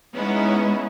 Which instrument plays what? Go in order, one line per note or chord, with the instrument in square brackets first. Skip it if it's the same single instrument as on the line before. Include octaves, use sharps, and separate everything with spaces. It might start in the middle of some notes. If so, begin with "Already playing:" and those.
[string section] G#3 B3 C#4 D#4 E4